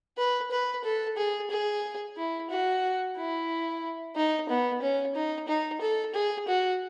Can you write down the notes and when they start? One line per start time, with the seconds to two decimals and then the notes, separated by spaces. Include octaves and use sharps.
0.17 B4
0.51 B4
0.84 A4
1.17 G#4
1.50 G#4
2.16 E4
2.50 F#4
3.16 E4
4.16 D#4
4.49 B3
4.82 C#4
5.15 D#4
5.48 D#4
5.81 A4
6.15 G#4
6.48 F#4